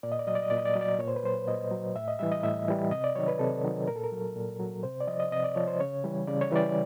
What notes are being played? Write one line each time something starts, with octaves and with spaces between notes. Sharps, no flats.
A#2 D5
D#5
D5
F#3 D#5
D5
D#5
A#2 D5
D#5
D5
F#3 D#5
D5
A#2 C#5
C5
B4
F#3 C5
A#2 D#5
F#3
A2 E5
D#5
E3 G3 E5
D#5
A2 E5
E3 G3
C3 D#5
D5
D#3 F#3 C#5
B4
C3 A4
D#3 F#3
A#2 A#4
A4
A#4
F#3
A#2
F#3
C3 C5
D5
F3 D#5
D#5
C3 D#5
D5
F3 C#5
C5
C#3 C#5
E3 G3
C#3 D5
C#5
E3 G3 D5